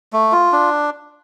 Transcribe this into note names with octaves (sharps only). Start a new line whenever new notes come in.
A3
F4
D4